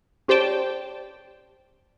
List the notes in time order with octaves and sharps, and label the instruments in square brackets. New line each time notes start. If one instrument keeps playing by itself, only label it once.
[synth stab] C#4 G4 C5 D5 G5 A5